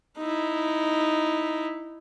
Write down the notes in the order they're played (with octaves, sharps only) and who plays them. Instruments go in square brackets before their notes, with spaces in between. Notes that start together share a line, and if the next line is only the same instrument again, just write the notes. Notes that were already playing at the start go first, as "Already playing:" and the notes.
[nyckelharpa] D#4 E4